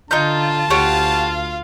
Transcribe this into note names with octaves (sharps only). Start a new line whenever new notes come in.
D3 D#4 F4 A5 A#5 G6
D2 F4 G4 C#5 F5 F#5